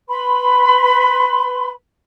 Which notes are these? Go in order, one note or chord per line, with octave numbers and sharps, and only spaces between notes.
B4 B5 C6